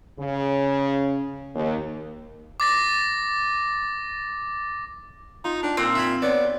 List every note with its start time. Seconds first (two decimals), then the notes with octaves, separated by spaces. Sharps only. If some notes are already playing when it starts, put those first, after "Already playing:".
0.19 C#3
1.55 D#2
2.60 D6 A6 A#6
5.44 D#4 F4
5.63 D4 D#4 G5
5.77 A#2 C4
5.95 E5 G#5 B5
6.22 B3 C#5 D5
6.45 C6